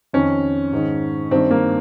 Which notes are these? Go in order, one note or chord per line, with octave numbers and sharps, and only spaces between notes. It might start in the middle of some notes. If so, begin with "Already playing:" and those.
F2 D#3 C#4
G#2 D#3
G2 D#3 C4
A#3